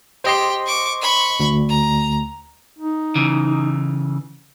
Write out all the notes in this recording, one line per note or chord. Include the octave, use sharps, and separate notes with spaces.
G4 C5 D#5 C6
C#6 D6
B5 C#6
D2
A#5
D#4
C#3 E3